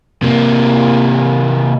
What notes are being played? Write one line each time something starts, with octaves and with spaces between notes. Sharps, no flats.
C3 A#3